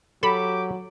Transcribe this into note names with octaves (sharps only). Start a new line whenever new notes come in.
F#3 G4 A4 B5 D6